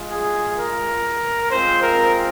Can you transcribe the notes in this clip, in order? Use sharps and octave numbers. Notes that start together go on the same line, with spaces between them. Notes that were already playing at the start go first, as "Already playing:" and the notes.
Already playing: G#3 F4
G#4
A#4
G#3 C4 F4 C5
A#4